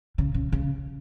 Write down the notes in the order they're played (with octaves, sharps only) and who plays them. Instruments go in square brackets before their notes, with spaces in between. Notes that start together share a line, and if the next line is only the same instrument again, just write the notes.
[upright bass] C#3
C#3
C#3